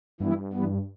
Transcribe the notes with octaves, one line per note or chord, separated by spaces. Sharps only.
G2 E3 G3 B3 E4
E3 G3 B3